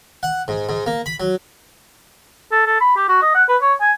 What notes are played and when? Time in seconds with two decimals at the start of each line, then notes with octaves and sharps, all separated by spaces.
0.23 F#5
0.48 G#2
0.69 G#2
0.86 A#3
1.06 B5
1.20 F#3
2.52 A4
2.66 A4
2.80 B5
2.96 G4
3.09 F#4
3.22 D#5
3.35 F#5
3.49 B4
3.61 C#5
3.81 G#5